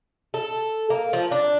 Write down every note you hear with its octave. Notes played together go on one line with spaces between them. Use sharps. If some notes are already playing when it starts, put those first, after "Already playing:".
A4
A#3
F3
D4